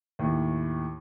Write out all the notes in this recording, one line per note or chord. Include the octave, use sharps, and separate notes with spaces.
D#2 A2